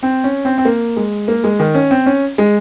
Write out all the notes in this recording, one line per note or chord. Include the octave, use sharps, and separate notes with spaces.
C4
C#4
C4
C4
A#3
G#3
A#3
G#3
D#3
C#4
C4
C#4
G#3